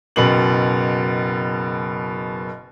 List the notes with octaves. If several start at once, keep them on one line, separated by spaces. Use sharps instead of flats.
F#1 B2 F#7